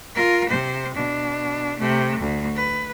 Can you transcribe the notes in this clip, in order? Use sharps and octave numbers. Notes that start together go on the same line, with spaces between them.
F4 A#4
C3 C5
B2 D4
C3 A3
D2
B4